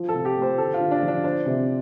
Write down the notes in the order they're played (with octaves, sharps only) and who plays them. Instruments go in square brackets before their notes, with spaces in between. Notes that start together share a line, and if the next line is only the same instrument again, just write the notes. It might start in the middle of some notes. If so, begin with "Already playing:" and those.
Already playing: [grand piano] F3 F4
[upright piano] A4
[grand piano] C3
[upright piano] G4
[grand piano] A3
[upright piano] C5
[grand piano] D3 [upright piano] A4
[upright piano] F4
[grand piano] D3
[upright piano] D4
[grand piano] F3
[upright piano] D4
[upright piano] D4 [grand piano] C5
[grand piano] C3